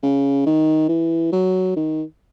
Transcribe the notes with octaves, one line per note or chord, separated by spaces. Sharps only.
C#3
D#3
E3
F#3
D#3